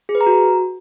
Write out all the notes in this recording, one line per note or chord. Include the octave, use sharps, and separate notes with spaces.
G#4
B4
A#5
F#4